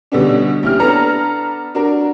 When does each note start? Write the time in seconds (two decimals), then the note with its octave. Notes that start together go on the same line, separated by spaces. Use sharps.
0.12 B2 D3 G3 B3 C#4 D4
0.63 A#1 C#4 E4 G4 F6
0.79 B3 D4 A4 B4 A#5
1.75 D4 F#4 A#4